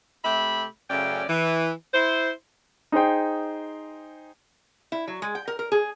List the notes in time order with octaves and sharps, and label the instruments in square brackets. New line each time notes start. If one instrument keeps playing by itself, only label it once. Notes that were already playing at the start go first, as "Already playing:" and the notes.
[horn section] C3 A3 G4 E5 B5
F#2 C#3 A3 C#4 D5 G5
E3
E4 C5
[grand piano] D#4 G#4 C5 G5
[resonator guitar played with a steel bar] E4
F#3
G#3
G5
A#4
A#4
G#4